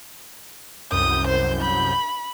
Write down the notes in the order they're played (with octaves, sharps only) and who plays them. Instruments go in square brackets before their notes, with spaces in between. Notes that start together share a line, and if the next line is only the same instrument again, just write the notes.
[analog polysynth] C2 F#2 G6 [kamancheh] D#6
[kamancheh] C5
B5